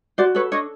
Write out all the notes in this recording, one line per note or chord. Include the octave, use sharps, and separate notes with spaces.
F#4 C5 D5
A4 B4 C#5
D4 C#5 D#5